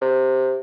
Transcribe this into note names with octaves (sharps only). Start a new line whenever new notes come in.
C3